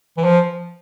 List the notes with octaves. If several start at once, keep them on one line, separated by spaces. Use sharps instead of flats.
E3
F3